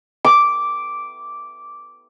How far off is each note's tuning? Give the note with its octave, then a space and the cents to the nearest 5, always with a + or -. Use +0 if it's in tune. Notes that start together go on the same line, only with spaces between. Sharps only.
D6 -5